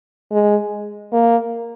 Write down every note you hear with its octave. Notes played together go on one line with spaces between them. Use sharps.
G#3
A#3